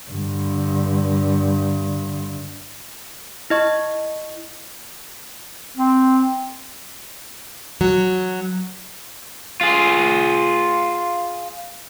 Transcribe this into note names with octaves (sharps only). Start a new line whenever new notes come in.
G2 D3
E4 D#5 C#6
C4
F#3
F4 G#4